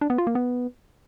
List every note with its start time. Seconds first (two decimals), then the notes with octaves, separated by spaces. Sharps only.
0.01 D4
0.10 B3
0.18 F4
0.27 A#3
0.35 B3